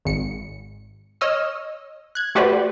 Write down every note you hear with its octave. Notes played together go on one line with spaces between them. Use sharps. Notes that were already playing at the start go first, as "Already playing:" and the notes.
G#1 C#7
C#5 D#5 E6 F6
F#6 G#6
A3 F#4 G4 B4 C5 D5